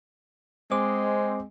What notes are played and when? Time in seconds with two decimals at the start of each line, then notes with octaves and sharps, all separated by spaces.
0.72 G#3 C4 C5 D6